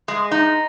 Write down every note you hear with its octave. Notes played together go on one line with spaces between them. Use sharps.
G#3
D#4